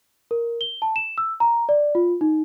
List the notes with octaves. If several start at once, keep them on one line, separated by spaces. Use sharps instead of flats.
A#4
G7
A5
E7
E6
A#5
D5
F4
D#4